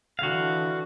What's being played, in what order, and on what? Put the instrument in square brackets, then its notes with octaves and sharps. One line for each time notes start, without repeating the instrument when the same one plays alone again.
[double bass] D3 E3 [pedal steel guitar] F#4 F5